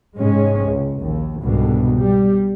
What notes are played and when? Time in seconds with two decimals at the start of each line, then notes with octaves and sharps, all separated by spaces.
0.18 G#2 C3 G#3 C#4
0.67 C#2
0.99 A#1 D#2
1.41 C2 G#2 B2 D3
1.97 G3